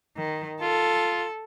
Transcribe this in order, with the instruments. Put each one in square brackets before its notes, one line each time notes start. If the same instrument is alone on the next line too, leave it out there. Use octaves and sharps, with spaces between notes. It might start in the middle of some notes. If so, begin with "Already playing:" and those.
[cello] D#3
[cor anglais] F4 [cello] A4